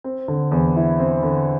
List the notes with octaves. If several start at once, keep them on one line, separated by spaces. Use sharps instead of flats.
C4
D3
E2
E4
C4
D3